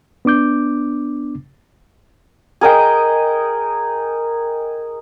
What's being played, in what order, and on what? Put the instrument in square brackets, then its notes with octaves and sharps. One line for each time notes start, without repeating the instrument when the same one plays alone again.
[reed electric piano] B3 D4 D6 G6
[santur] G#4 A#4 D#5 G5